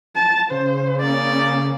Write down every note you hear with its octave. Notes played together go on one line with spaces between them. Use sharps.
A5
C#3 C5
A#3 C#4 D5